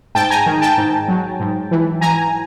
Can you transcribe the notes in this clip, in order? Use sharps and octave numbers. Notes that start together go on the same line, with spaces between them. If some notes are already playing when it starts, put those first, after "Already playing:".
G#2 G5 A5
G#5 A#5
D#3
G5 A5
G#2
F#3
G#2
E3
E3 G#5 A#5